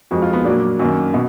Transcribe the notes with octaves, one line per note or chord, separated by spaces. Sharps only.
F2 F3 G#3 F#4
F4
B3
A#2 F#3 A#3 D4
F#2 D#3 A#3
B2